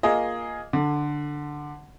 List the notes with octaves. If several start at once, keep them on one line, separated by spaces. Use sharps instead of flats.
A#3 F4 G#4 D#5
D3